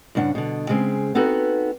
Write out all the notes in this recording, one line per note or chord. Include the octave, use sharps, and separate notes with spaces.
G2 C#3 D4 F#5
B2 D3
C#3 G#3 C4
B3 C4 D#4 F#4 A4 B4